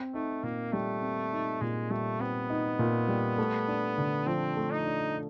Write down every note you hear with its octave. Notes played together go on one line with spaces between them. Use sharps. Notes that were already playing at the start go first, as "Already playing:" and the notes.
Already playing: C4
A3 D#4
A#2 A#3
G3 A3
C4
D#4
A#2 G#3
G3 A3
B3 C4
D#4
A#2
G3
A3
D4
D3
F3 C4
A3
D#4
D4